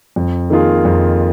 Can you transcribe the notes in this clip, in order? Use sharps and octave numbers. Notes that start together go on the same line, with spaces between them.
F2
D#3 A#3 F4 G#4
F2